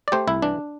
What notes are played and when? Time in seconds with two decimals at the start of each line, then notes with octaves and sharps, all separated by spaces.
0.08 D5
0.12 A3 G4 C5
0.27 C2 E4
0.42 E3 D4